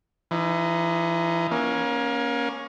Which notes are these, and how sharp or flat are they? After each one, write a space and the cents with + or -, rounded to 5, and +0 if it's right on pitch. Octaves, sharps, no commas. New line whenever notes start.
E3 +30 D#4 +0
A#3 +30 C#4 +0